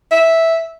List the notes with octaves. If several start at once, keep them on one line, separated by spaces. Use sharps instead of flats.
E5